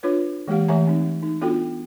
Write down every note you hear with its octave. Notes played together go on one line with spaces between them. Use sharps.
D4 F4 B4 C#5
E3 G#3 A#3 G4 F5
E3 A3 E5 G#5 A#5
C4 D#4
D#4
B3 D4 F4 F#4 A4 G5